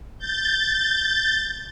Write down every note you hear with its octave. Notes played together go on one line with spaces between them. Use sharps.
G6 A6